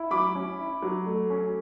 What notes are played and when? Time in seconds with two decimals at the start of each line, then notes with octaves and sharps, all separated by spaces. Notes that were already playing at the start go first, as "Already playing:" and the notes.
Already playing: E4
0.11 F#3 B5 D6
0.35 C#4
0.59 E4
0.83 F#3
1.06 A3
1.30 C#4